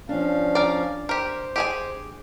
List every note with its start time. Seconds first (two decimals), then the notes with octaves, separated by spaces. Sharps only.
0.09 F3 C#4 D4 F5
0.55 A#4 D5
1.09 G4 A#4 C5
1.56 G4 G#4 G#5